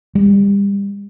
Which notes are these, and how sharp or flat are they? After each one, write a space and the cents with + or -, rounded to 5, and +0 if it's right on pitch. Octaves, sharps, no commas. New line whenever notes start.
G3 +30